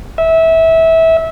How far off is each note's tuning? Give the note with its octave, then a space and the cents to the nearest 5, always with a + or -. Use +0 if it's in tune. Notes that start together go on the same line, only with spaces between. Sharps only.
E5 -20